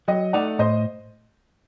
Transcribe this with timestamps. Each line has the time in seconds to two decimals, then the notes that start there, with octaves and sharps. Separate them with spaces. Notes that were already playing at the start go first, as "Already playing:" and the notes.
0.08 F#3 D#5 G5
0.33 A3 D#4 D5 F#5
0.59 A2 C5 D#5